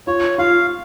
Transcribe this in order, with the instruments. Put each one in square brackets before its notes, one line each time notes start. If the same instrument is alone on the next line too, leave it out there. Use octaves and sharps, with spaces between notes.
[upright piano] F4 [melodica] C#5
[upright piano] F4 [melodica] F5